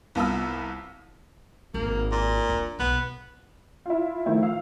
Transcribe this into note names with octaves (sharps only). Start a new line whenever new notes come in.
C2 B3 F4 A5 D#6 E6
G#1 A#3
A#2
D4
B1 B3
E4 F4
D#3 F3 A3 E4
F5 E6